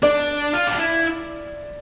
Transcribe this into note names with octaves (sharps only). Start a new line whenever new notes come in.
D4 D5
F4
D4
E4